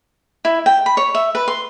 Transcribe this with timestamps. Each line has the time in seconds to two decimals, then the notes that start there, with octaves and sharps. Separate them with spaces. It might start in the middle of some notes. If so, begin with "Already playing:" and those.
0.45 E4
0.66 G5
0.86 B5
0.97 C#5
1.15 E5
1.35 B4
1.48 C6